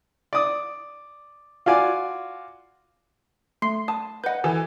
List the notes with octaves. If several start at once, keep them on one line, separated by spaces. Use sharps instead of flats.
D5 D#6
F4 F#4 D5 G#5
A3 C6 C7
A5 D#6
B4 D#5 F#5 G6
E3 A4